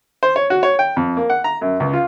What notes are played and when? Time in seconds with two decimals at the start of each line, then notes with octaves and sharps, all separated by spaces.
0.23 C5
0.36 C#5
0.50 F#4
0.63 C#5
0.79 G5
0.97 F2
1.17 A#3
1.30 F#5
1.44 A#5
1.61 F#2
1.80 C#2
1.93 F4